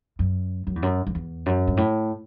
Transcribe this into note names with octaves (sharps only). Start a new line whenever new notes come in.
F#2
F#2
E2
F#2
F#2
E2
F#2
G2
A2